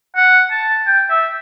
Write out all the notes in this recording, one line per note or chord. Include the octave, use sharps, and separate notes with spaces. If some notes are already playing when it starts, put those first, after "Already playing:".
F#5
A5
G5
E5